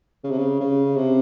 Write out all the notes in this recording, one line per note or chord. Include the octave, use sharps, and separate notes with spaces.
C#3
C3
C#3
C#3
C3